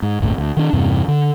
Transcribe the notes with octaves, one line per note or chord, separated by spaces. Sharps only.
G#2
G1 D2 A2
D2
D#3 D4
E2 G2 C3
D3